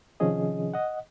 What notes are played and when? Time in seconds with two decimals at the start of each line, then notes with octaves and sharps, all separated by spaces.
0.20 C3 D#3 F3 C#4 G#4 D#5
0.74 D#5 F#5